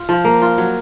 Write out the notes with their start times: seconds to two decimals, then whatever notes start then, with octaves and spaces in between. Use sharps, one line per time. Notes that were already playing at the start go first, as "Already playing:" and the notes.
Already playing: F4
0.09 F3
0.25 A#3
0.42 F4
0.58 F#3